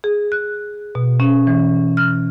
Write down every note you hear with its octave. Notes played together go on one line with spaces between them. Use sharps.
G#4
F#6
B2
C#4
E3
F6